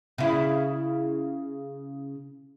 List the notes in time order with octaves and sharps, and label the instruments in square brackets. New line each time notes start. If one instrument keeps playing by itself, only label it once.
[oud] C#3 E4